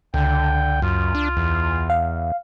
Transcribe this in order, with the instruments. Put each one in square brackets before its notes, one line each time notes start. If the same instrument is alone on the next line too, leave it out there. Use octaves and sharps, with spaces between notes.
[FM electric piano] C#2 [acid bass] D3 [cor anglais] G5
[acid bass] F#2 [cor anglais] F4
[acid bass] D4
E2
[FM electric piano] F5